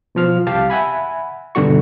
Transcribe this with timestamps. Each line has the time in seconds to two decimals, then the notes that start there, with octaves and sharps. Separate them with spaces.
0.15 B2 F3 F6
0.47 C2 G4 F5 A5
0.70 E5 F#5 G#5 B5
1.55 G2 B2 D3 G3 F#4 C#6